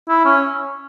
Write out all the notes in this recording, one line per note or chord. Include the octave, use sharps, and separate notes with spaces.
E4
C#4